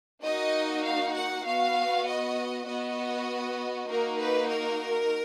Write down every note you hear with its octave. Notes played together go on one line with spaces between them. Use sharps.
A#3 D#4 F#4 D#5
F5
F#5
B3 F#4 F5
D#5
B3 F#4 D#5
A#3 D#4 F#4 A#4
B4
A#4